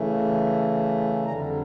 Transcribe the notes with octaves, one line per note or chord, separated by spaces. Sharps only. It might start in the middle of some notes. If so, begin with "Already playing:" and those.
Already playing: C#3 E3 A3
F2 D3 G3 A#5